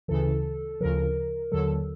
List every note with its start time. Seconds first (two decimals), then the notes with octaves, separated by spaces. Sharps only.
0.08 D2 C#3 E3 A4
0.80 D2 C#3 F3 A#4
1.52 D#2 D3 F#3 A4